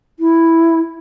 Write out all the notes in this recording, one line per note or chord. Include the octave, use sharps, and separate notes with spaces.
E4